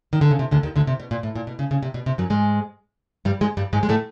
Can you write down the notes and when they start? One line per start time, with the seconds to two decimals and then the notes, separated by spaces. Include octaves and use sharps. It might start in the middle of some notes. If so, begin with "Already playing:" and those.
0.13 D#3
0.21 D3
0.31 C#3
0.39 C3
0.51 D2 D3
0.63 D#2 D#3
0.76 D2 D3
0.87 C3
1.00 B2
1.11 A#2
1.23 A2
1.35 A#2
1.47 B2
1.59 C#3
1.71 C#3
1.83 C3
1.94 B2
2.06 C3
2.18 F#2 F#3
2.30 G#2 G#3
3.25 G2 G3
3.41 G#2 G#3
3.57 G2 G3
3.73 G#2 G#3
3.83 G#3
3.89 A2 A3